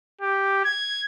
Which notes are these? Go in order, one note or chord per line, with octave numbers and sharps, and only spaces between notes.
G4
G#6